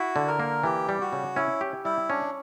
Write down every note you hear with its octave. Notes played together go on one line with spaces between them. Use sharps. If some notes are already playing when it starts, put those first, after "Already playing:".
Already playing: E4 F#4
D3
A#4
A#3
E3 G4
G3
F#4
C#3
C#4 E4
G4
G3 E4
C#4 D4